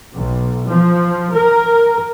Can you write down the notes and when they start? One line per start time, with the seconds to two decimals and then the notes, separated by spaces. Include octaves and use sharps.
0.14 B1
0.68 F3
1.33 A#4